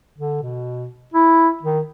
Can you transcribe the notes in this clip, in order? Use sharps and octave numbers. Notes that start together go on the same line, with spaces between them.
D3
B2
E4
D#3